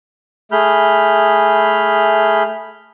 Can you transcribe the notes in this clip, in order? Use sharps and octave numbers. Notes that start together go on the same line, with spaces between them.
A3 G#4 B5 F6 G6